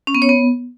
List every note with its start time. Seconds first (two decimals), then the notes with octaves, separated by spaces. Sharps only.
0.07 C#4
0.15 B3
0.22 C#5
0.29 B3